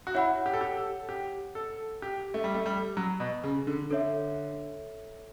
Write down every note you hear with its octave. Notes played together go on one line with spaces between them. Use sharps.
F#4
E4 C#5 F#5 B5
G4
A4
G4
A4
G4
A4
G4
A3
G3
A3
G3
F#3
B2
C#3
D3
D3 A4 C#5 E5